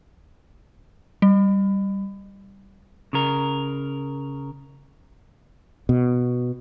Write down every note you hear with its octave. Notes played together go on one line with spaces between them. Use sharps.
G3
C#3 A#4
B2